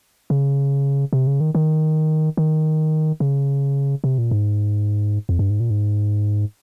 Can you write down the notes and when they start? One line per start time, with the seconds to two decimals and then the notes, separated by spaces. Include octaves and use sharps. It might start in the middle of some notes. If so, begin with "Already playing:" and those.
0.30 C#3
1.13 C3
1.27 C#3
1.40 D#3
1.55 D#3
2.37 D#3
3.20 C#3
4.04 C3
4.18 A#2
4.31 G#2
5.29 F2
5.39 G2
5.50 G#2
5.60 A#2
5.70 G#2